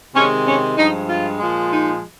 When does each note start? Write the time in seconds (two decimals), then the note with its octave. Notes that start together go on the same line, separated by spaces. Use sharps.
0.15 C3 D#3 G#3 C#4
0.46 C#4
0.77 G2 F3 G#3 D#4
1.08 F4
1.40 A#2 F3 G#3
1.72 D#4